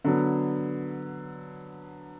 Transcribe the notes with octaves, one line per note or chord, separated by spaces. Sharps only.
D3 F#3 B3